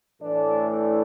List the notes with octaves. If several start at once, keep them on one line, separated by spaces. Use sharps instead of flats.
A2 E3 A3 D4
D4